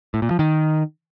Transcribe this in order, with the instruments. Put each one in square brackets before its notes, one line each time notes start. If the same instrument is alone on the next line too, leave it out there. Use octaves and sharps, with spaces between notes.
[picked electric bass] A2
A#2
F3
D#3